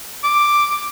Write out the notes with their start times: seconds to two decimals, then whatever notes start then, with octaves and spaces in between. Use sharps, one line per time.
0.24 D6